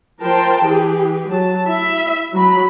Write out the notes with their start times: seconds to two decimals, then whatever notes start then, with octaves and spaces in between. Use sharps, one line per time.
0.21 F3 A#4 C5 G5 A5
0.62 E3 G4 G#4
1.28 F#3 A5
1.64 E4 E5
2.32 F#3 B5